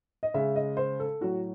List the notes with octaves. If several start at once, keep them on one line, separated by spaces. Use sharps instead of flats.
D#5
C#3 G#3 E5
D#5
C5
A4
A2 F#3 F#4